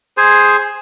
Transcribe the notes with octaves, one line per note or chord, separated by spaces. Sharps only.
G#4 C5 G#5